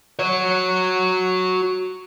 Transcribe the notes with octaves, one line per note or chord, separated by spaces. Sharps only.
F#4 C#5